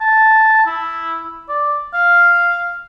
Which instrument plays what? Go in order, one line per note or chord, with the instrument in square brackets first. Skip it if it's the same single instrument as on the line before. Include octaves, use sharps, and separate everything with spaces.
[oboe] A5
E4
D5
F5